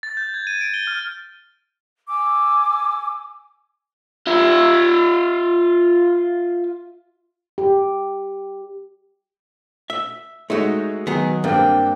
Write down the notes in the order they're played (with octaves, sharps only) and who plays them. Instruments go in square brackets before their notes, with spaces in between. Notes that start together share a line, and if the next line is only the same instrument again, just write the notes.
[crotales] A6
G6
G#6
D#7
D7
G7
F6
[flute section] G#5 D6 E6
[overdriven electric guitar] F4 E5
[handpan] G4
[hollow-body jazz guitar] E5
[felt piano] G#3 [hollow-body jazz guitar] A3 F#4 [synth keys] D#4 C#5
[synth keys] D#3 F#3 [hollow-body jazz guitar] B3 G#4
[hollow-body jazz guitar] G2 [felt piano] A#3 C4 [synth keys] D4 [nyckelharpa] G5